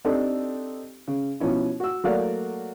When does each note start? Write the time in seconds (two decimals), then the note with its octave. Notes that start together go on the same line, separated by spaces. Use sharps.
0.05 C4 D4 D#4 G4 A4
1.08 C#3
1.40 B2 F3 C#4 E4
1.80 F#4 E6
2.04 F#3 A3 A#3 F#4 D5 F5